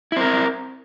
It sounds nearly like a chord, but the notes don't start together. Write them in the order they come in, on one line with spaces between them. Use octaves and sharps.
E4 C4 A#4